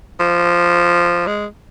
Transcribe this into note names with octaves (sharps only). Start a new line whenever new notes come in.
F3
G#3